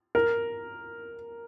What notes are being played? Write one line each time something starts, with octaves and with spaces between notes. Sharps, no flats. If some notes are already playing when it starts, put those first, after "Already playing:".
A#4